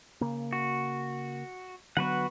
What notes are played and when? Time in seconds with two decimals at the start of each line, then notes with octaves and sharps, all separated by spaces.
0.21 C#3 A#3
0.53 F#4
1.97 D3 F#3 B3 F#4 B4 F#5